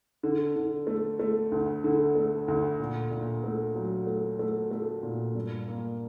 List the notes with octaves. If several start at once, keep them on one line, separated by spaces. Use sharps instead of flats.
D3
D3
A3
A3
D2
D3
A3
D2
A#2
A#2
A3
F#3
A3
A3
A3
A#2
G2
A#3